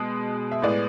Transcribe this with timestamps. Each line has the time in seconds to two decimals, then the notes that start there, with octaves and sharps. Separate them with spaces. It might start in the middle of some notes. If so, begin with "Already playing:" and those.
Already playing: B2 G#3
0.52 E5
0.62 A2 G#3 B3 D5